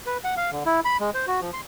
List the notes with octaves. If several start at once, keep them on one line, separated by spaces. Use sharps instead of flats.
B4
F#5
F5
D3
E4
B5
G#3
C5
F#4
F3
C6